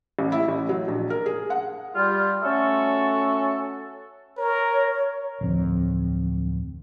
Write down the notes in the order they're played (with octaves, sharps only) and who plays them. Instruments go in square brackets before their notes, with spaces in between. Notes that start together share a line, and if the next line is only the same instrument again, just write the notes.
[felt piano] A1
E4
A1
F#3
A#1
A#4
G#4
F#5
[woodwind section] G3 F4
A3 C#4 F#4 A4
[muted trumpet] A#4 [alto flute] C#5
[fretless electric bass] D1 F2